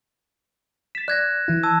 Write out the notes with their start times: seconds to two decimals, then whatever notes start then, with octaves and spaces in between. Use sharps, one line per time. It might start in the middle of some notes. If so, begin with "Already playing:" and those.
0.95 A6 B6 E7
1.08 D5 F#6 G#6 A#6
1.48 E3 E4
1.63 A5 E6 G#6